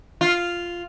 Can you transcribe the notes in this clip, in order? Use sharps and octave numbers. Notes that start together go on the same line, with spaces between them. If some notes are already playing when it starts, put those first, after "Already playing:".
F4